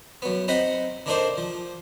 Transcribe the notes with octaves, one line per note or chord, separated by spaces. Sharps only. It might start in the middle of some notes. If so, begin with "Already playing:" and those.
F#2 B3
C4 D#4 D#5 F#5 B5
D3 A#3 D4 D#4 C5
F3